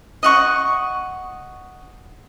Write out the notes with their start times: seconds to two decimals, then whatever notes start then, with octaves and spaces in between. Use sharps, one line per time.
0.23 D#5 F#5 C#6